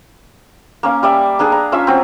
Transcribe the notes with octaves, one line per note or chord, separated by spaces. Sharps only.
A#3 C#4 F5
G3 D5 E5
A#3 D4 G#4
A#5
C#4 F4 E5 E6
F#3 C4